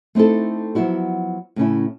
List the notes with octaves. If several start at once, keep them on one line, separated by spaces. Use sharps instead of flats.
A3 C4 D#4 E4 A4
F3 F#3 B3 E4 F#4
A2 C#3 C#4 E4